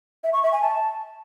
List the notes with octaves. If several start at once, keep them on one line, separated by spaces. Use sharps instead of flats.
E5
C#6
E5
G#5
A5